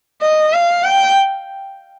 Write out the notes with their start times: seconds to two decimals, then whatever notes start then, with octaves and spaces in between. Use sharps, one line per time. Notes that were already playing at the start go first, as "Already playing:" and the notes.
0.22 D#5
0.53 F5
0.84 G5